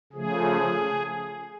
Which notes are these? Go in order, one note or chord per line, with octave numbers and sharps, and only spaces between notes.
C#3 F3 A3 G#4